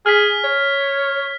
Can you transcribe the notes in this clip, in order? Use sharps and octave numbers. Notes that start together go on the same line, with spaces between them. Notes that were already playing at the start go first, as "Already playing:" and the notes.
G#4 F6 B6
C#5